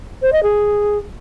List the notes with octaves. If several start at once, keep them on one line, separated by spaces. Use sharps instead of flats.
C5
D#5
G#4